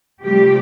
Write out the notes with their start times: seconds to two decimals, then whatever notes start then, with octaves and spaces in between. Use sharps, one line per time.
0.22 C3 F3 G3 A3 G4